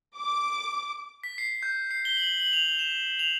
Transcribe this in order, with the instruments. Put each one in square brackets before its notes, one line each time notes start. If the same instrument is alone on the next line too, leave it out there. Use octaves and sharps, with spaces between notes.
[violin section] D6
[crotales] B6
C7
G6
C7
G7
F#7
F#7
F7
E7
F7